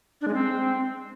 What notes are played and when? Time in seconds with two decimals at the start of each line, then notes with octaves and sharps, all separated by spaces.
0.21 D4
0.28 G#3
0.34 C4